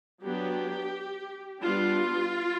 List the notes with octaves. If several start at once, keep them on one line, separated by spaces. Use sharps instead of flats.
F#3 B3 D4 G4
G3 B3 D4 F4